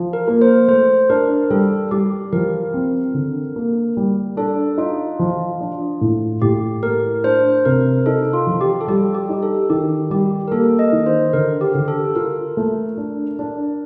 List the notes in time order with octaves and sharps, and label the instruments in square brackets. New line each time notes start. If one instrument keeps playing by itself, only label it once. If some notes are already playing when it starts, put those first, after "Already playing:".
Already playing: [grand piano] F3
[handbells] A#4
[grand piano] A#3
[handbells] C5
[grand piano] A3 [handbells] C5
[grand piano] D4 [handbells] A#4
[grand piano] G3 [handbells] A4
[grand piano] G3 [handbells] G4
[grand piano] F3 [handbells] A#4
[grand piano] C4
D3
A#3
G3
[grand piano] D4 [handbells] A4
[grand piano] D#4 [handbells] F4
[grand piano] F3
D4
A2
[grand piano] A2 [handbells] G4
[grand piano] A3 [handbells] A#4
[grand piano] D4 [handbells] C5
[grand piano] C3 [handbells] A#4
[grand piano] D#4 [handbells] A4
[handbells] F4
[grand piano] F3
[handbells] G4
A4
[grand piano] G3 [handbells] G4
[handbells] G4
[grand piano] D#4
[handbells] A4
[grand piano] D#3 [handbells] G4
[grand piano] G3 [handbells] G4
[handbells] A#4
[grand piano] A#3 [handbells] A4
[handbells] D#5
[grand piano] D#3
[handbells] C5
[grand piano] D3 [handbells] A#4
[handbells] G4
[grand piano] D3
[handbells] A4
[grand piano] F4 [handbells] A#4
[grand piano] A3
D4
D4